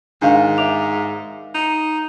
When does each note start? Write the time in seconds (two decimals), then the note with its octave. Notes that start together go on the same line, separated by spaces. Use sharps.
0.22 G#2 D#3 D4 F5 F#5
0.58 E5 D6 F7
1.54 D#4